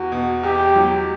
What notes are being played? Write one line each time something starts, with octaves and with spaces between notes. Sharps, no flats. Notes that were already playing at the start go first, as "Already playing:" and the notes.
Already playing: E2 F#4
B2
E2 G4
F#3